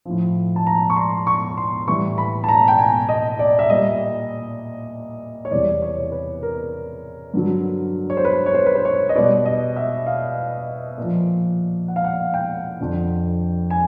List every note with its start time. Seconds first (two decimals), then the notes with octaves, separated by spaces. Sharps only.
0.05 A2 F3
0.56 A5
0.67 A#5
0.90 C#6
0.96 C6
1.27 C#6
1.58 C6
1.88 A2 E3 G3 C#6
2.18 B5
2.44 A5
2.49 A#5
2.68 G5
2.79 G#5
3.09 D#5
3.39 D5
3.59 E5
3.70 A#2 G3 D#5
5.45 C#5
5.51 E2 C3 E3 G3 D5
5.82 C#5
6.12 B4
6.43 A#4
7.34 G2 D3 F#3
8.10 C#5
8.17 C5
8.25 B4
8.46 C#5
8.54 C5
8.66 B4
8.75 C5
8.85 C#5
9.09 D#5
9.15 B2 G3 D5
9.46 D#5
9.76 E5
10.06 F5
10.98 A#2 F3
11.88 F#5
11.96 F5
12.04 F#5
12.34 G5
12.80 F2 D3 F3
13.70 G#5